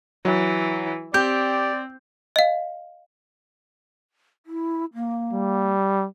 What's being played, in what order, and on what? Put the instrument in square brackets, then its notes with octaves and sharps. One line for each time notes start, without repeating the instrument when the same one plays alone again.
[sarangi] E3 [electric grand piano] F#3
[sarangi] C4 [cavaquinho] G4 [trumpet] D5 [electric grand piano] G6
[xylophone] D#5 F5
[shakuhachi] E4
A#3
[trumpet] G3